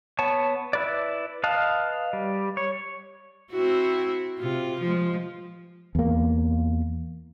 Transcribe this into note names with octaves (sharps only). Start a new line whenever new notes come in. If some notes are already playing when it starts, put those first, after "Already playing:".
B3 C#5 A5
E4 B4 D5
B4 D#5 F5 A5
G3
C#5
C4 E4 F#4
C3 F4
F3 G#3
E2 A#3